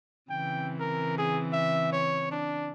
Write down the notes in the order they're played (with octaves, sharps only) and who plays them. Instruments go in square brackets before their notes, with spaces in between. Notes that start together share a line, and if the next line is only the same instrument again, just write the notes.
[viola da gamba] C#3 E3 C4 [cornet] G5
[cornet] A#4
G#4
E5
C#5
D4